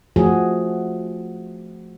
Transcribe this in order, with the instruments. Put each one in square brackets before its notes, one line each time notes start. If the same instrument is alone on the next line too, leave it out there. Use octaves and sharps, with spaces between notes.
[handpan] F3 A3 F#4 G#4